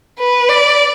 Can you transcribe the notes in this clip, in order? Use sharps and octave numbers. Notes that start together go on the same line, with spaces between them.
B4
D5